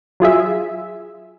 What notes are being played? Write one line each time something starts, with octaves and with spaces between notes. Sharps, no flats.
F#3 F4 G#4 E5